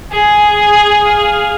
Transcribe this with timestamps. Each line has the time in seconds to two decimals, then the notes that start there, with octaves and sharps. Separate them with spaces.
0.11 G#4 G#5
1.05 F5